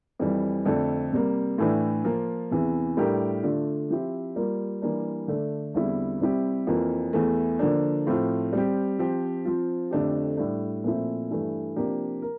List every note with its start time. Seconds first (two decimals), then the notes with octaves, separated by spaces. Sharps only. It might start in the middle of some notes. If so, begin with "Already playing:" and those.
0.19 F2 E3 G3
0.65 F2 D3 A3 D4 A4
1.13 C3 G3 A#3
1.58 A2 E3 A3 D4
2.04 F3 A#3 F4
2.51 E2 C3 E3
2.97 A2 G3 D4 G4 A#4
3.43 D3 A3 D4 F4
3.90 F3 C4 E4 G4
4.36 G3 A#3 F4 A#4
4.82 E3 G3 A#3 D4
5.28 D3 A3 D4
5.74 E2 D3 G3 C4 E4
6.21 C3 G3 C4 E4 G4
6.67 F2 E3 A#3 F4
7.13 E2 E3 A3
7.59 D3 F3 A#3 D4
8.07 A2 F3 C4 F4
8.53 G3 C4 G4
8.99 F3 C4 G4
9.45 F3 C4 F4
9.91 F2 D3 A3 D4 G4
10.37 A2 G3 D4
10.84 A#2 F3 A3 C4 E4
11.31 G2 E3 A3
11.76 C3 F3 A#3 D4 G4
12.22 A#4